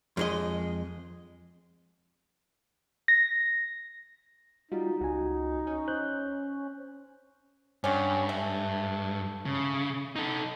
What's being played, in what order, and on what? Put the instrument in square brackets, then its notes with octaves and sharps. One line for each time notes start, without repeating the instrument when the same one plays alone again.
[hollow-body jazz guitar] F2 G#3 D#5
[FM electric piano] A#6
[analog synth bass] G3 [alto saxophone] D#4 [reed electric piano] F4 F#4
[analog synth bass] C#2 [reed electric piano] F#4 G#5
[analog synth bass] C#4
[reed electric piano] C5 F#6 G6
[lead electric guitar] G2 [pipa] D3 C#4
[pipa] A3
[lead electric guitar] C#3
D#4 A4